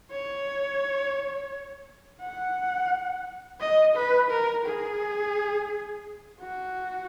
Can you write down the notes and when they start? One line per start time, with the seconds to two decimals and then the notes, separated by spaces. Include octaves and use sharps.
0.12 C#5
2.21 F#5
3.60 D#5
3.95 B4
4.31 A#4
4.66 G#4
6.40 F#4